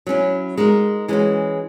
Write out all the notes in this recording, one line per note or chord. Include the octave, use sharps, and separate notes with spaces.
F#3 C#4 E4
G#3 D#4 F#4 A#4
E3 G#3 C#4 F#4